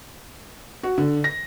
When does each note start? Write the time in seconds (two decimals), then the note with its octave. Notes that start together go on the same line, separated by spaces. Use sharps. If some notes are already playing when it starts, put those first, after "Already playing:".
0.83 F#4
0.98 D3
1.24 A#6